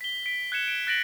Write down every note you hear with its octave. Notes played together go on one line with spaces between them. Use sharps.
B6 G7
B6 D7
F#6 G#6 C#7 E7
D7 E7
F#6 A6 A#6 D7 F#7